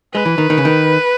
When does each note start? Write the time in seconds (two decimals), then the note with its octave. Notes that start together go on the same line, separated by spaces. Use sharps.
0.14 G#3 B4
0.26 E3
0.38 D#3
0.50 D#3
0.58 C#3
0.65 D#3